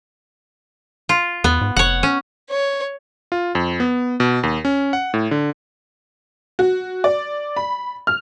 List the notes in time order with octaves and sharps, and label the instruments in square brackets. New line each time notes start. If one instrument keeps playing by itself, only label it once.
[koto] F4
[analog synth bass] E2 [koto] B3
[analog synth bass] G#2
[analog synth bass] F1 [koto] C#5 F#5
[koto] C#4
[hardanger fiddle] C#5
[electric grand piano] F4
F2
B3
B2
D#2
C#4
F#5
A2
D3
[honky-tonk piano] F#4
D5
B5
F6